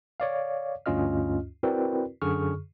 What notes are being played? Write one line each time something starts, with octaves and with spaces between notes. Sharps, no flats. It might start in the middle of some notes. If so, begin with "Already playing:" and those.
C#5 D5 F5
D2 G2 C#4 F4 D#5 F6
C4 E4 F#4 A#4 B4 D5
F#2 D3 G#4 C#6 F6